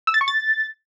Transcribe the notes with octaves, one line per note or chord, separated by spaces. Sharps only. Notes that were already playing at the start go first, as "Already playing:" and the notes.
E6
A6
C#6
A6